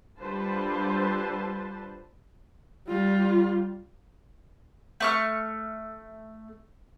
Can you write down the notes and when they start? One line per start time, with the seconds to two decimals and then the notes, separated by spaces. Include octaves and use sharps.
0.21 D3 G3 F4 B4 C5 A5
2.87 G3 F4
5.00 A3 C#6 F6